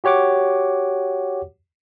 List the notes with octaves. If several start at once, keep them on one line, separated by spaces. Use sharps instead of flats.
F#4 G4 C#5 F#5 D6